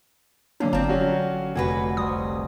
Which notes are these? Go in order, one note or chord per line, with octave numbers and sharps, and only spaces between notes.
D3 F#3 A#3 C#4 D4 C7
G1 C4 F4 A5 A#5
F#3 C#4 F#4
F1 A#3 F#4 B4 G#5
C2 D#6